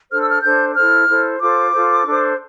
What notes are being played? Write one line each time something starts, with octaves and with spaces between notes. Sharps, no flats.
D4 A4 C5 F6
E6
F6
D4 A4 C5 G6
E4 A4 C5 F6
E4 A4 C5
F4 A4 C5 D6
F4 A4 C5
D4 A4 C5